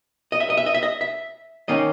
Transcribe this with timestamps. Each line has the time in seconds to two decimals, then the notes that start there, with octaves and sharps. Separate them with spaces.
0.32 D#5
0.40 E5
0.50 D#5
0.57 E5
0.66 D#5
0.74 E5
0.83 D#5
1.01 E5
1.68 D#3 A#3 C#4 D#5